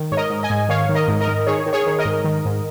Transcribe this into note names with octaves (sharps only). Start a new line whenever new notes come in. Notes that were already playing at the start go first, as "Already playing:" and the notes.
Already playing: D#3
G#2 C#5
A#4 D#5
G#2
D#5 G#5
G#2
D#3 C#5 F5
D#3
A#4 D#5
G#2
A#4 D#5
D#3
D#3 G#4 C#5
D#3
G#4 C#5
D#3
A#4 D#5
G#2
D#3
G#2